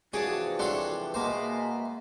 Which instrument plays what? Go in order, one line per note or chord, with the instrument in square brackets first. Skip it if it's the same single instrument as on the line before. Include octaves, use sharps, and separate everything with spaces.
[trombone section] C3 E3 F3 [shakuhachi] F#4 [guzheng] G#4 D5 A5 [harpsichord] C#5
[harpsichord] D4 A4 C#5 [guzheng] F#5 C6
[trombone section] B2 G#3 [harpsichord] A#3 C5 [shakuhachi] E5